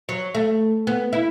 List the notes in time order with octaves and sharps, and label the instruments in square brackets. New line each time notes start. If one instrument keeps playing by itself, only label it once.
[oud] F#3
A3
B3
E4